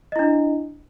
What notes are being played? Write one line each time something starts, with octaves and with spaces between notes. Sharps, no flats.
D4 E4 D#5